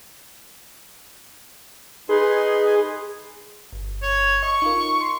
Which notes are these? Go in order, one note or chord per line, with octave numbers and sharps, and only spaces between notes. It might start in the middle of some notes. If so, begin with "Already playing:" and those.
D#4 G#4 B4 C6
G1
C#5
D#5 C#6
D#4 F4 A#4
C6 C7